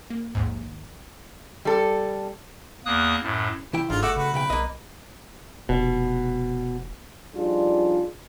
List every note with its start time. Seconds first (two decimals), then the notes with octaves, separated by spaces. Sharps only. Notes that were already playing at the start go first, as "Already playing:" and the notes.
0.10 A#3
0.35 A#1 D#2 G#2
1.65 G3 A4
2.86 E2 A#3 D#6 F#6
3.23 F#2 A2
3.73 C2 E3 E4 G5
3.90 G1 G#2 D3 F4
4.02 A3 F#4 D6 E6
4.16 C#3 F#4 B4
4.34 B1 C#3 B4 G5
4.50 B1 A#3 D#5
5.69 F1 B2
7.34 F3 G3 D4 D#4 F4 G#4